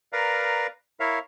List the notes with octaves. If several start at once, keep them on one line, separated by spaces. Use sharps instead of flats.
A#4 B4 D5 F5 A#5
E4 A#4 C#5 E5 F5